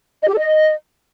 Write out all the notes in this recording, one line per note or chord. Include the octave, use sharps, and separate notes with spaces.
D#5
G4
A4
D#5